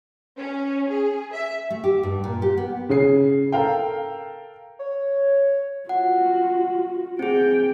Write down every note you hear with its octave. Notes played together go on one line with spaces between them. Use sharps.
C#4
G#4
E5
A3
G4
G2
A#2
G4
B3
C#3 G#4 C7
A4 A#4 F5 G5
C#5
F4 F#4 F#5
C4 G#4 G5